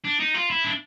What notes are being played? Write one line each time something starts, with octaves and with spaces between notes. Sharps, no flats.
D4
D#4
F4
E4
D4